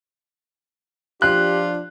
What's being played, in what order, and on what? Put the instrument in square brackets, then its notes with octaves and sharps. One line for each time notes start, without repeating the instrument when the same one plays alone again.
[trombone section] F3 D4 [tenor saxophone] F4 [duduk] G4 [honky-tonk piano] F#6